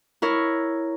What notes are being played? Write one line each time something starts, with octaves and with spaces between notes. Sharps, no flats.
E4 A#4 C#5